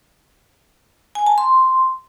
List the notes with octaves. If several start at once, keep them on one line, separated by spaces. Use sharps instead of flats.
G#5
A5
C6